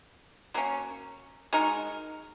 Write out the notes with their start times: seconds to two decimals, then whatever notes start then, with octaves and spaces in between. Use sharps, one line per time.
0.54 F#3 A#3 C#4
1.53 G#3 D#4 F#4 A#4